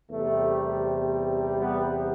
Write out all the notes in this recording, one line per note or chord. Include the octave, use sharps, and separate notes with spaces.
E2 C3 G3 A3
G3 B3